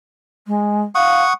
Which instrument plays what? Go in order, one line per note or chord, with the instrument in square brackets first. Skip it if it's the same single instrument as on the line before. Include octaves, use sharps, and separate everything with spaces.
[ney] G#3
[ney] F5 [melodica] F#5 C#6 D#6